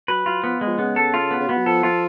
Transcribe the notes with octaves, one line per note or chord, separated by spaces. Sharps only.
F#3 B4
F#3 F4
F3 B3
G#3
F3
C#3 B3
A4
F4
B3
C#3
B2 B3
F#3
F3 A4
F3 F4